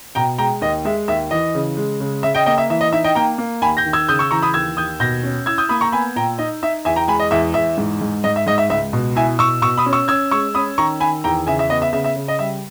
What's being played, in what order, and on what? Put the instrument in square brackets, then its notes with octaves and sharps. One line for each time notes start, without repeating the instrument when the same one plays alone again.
[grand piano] B2 G5 A#5
G#3 G5 A#5
D#2 D#5
G#3 E5
D#2 E5
E3 D#5
C#3
G#3
C#3
C#3 E5
D#5 G5
A#3 D#5 G5
E5
E3 E5
D#5
D#4 E5
D#5 G5
A#3 G5 A#5
A#3
D#2 G#5 B5
G6 A#6
D#3
E6 G#6
C#3 D#6 G6
C#6 E6
E3 A#5 C#6
B5 D#6
D#2 E6 G#6
D#2 D#6 G6
B2 G6 A#6
C#4
E4 E6 G#6
D#6 G6
A#3 B5 D#6
A#5 C#6
B3 G#5 B5
A#2 G5 A#5
D#4 D#5
D#4 E5
E2 E5 G#5
G5 A#5
G#3 G#5 B5
D#5
E2 E5
E2 E5
G#2
G#2
G#2 D#5
E5
G#2 D#5
E5
C#2 E5
B2
E4 E5 G#5
B2 C#6 E6
B2 C#6 E6
B5 D#6
C#4
C#6 E6
C#4 E6 G#6
G#3 C#6 E6
C#4 B5 D#6
D#3 A#5 C#6
D#3 G#5 B5
E2 G5 A#5
C#3 E5 G#5
E5
B3 D#5
E5
C#3 E5
E5
C#3
D#5
G3 E5